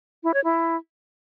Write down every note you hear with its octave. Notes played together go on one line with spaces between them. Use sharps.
E4
C#5
E4